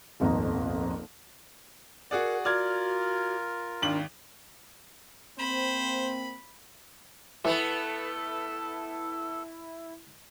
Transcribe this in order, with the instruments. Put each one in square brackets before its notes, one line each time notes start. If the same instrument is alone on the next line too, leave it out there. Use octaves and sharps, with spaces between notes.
[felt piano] D#1 G#1 F2 B3 D#5 A#5
[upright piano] F#4 G#4 D5 [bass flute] A#4 [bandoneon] F#5
[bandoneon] F4 A#4 [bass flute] F#4 [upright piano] D5 F6 G#6
[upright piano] G#1 D#2 F#7 [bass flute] D4
[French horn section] A#3 C4 [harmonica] C5 [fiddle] B5
[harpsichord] E3 [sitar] A3 B3 [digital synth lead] E4 [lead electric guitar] A4